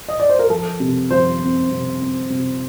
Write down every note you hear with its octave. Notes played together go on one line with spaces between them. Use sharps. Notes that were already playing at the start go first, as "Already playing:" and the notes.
D#5
D5
C5
A#4
F3 A4
C3
F3 C5
C4
C3
C4
C3